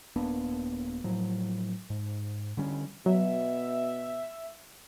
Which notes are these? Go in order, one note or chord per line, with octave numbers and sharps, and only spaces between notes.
D#1 A#3 B3 D4
A2 F3 F#3
G#2
D3 G3 C#4
B2 F#3 E5